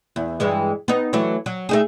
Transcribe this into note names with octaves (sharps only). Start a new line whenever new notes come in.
E2
G2 E3 G#3
B3 D#4
E3 F#3 A3
F#3
A3 D#4 G#4